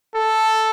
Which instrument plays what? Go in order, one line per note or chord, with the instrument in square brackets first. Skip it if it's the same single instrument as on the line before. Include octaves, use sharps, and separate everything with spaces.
[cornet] A4